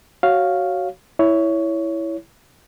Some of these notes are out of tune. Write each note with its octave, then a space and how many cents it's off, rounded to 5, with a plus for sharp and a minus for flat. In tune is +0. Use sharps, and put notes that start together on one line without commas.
F#4 +15 C#5 +0 F5 +0
E4 +0 C#5 +15